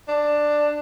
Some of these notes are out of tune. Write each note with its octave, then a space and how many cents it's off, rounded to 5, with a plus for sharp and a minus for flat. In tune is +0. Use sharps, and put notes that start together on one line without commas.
D4 +10